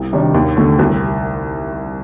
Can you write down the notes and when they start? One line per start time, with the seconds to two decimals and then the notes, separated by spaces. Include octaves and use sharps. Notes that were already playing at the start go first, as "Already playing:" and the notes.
Already playing: C2
0.12 C3 D#3 G3 D4
0.34 D#2
0.57 D3 A3
0.79 C2